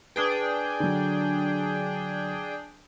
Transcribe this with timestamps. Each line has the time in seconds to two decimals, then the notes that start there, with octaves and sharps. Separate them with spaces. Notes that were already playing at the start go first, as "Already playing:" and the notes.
0.16 D4 G#4 B4 G5 D#6
0.80 D3 F#3